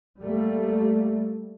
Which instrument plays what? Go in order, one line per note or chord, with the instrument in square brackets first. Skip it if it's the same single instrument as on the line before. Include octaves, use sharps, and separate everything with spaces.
[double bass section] G3 A3 A#3